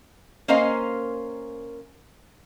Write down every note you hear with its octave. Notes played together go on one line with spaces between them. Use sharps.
A#3 C#4 A#4 C5 D#5 F5